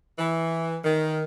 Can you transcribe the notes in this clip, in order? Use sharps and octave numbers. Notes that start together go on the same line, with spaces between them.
E3
D#3